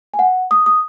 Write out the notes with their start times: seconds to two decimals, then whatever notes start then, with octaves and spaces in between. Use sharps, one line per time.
0.14 G#5
0.19 F#5
0.51 D#6
0.66 D#6